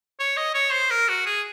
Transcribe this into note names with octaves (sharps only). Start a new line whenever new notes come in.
C#5
D#5
C#5
C5
A#4
F#4
G#4